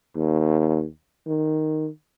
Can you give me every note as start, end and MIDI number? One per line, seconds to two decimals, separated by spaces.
0.16 0.85 39
1.28 1.88 51